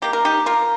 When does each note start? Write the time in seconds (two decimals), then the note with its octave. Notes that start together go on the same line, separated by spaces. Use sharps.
0.02 D#3 A#3 G4
0.13 A#4
0.25 D#4 G4
0.46 F4 A#4